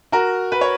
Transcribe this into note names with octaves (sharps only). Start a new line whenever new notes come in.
F#4 A#4
B4
C#5